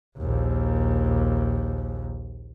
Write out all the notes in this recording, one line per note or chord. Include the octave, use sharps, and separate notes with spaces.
A#1 D#2